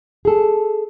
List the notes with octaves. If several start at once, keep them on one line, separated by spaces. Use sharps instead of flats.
G#4 A4